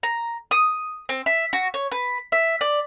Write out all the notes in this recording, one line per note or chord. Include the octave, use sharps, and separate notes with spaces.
A#5
D#6
C4
E5
F#4
C#5
B4
E5
D5